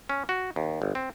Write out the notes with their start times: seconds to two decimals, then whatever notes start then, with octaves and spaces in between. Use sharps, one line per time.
0.09 C#4
0.29 F#4
0.56 D#2
0.82 G1
0.95 C4